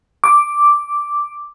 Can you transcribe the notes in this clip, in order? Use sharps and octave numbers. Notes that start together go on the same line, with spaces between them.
D6